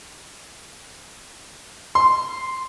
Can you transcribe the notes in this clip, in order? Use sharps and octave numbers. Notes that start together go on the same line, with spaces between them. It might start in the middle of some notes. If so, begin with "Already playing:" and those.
C6